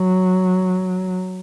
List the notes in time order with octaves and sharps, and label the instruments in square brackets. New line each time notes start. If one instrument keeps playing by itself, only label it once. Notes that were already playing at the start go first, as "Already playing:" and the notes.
Already playing: [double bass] F#3